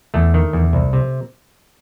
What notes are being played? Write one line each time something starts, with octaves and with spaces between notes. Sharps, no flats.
E2 A3
D#3
E2
C2
C3